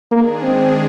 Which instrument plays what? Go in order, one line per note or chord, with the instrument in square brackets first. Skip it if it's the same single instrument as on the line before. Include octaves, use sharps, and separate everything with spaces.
[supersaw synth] D#3 G#3 D4 G#4 [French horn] A#3
[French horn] C4